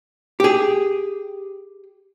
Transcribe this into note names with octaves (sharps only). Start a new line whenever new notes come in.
G4 G#4